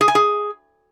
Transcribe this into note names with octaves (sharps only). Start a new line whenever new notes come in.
G#4
G#5
G#4